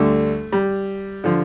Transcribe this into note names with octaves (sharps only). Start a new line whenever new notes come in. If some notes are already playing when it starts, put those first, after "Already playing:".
Already playing: D2 D3 G3 A3
G3
D3 F3